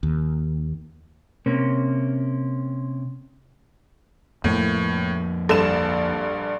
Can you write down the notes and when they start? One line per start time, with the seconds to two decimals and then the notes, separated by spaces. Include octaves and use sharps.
0.03 D#2
1.46 C3 A#3 C#4
4.44 F2 A2 F3 A#3
5.49 A#1 G2 A4 E7